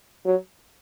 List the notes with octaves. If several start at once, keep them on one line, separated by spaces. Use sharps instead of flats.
F#3